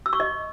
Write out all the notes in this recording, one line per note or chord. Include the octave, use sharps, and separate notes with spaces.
E6
C#6
D#5